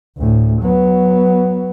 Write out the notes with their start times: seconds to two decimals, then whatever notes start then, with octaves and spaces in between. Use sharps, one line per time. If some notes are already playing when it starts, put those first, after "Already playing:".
0.18 D2 A2
0.62 F#3 B3